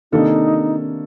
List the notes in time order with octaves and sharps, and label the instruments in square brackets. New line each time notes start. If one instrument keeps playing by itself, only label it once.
[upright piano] C3 D#3 A#3 D4 A4 [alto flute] D#4